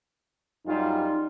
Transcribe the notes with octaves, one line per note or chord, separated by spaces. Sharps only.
F#2 G3 D#4 F4